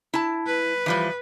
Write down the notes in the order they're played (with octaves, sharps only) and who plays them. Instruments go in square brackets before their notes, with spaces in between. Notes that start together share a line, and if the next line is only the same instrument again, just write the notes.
[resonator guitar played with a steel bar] E4 A5
[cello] B4
[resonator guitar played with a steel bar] E3 F3 G3